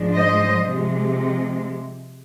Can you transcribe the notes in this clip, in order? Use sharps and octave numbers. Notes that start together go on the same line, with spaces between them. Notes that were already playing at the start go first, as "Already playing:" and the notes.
Already playing: G#2 F3 G#3 D4
C5 D#5
C3 F3 G#3